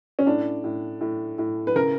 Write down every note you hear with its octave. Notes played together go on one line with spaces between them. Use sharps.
C#4
A2 D4
A2
A2
A2
B4
C#3 A#4